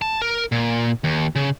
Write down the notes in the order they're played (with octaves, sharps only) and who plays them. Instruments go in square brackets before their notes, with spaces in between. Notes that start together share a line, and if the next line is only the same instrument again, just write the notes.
[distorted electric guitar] A5
A#4
A#2
D#2
C#3